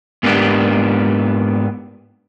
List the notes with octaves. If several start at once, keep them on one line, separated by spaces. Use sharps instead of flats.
G#2 A#3 B3 D4 G4